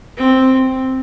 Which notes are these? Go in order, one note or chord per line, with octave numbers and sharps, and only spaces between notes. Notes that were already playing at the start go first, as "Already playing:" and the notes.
C4